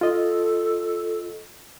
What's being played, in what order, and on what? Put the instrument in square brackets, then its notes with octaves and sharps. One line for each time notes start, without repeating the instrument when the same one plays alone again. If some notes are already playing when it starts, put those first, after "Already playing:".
[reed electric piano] F4 D#5 [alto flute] A4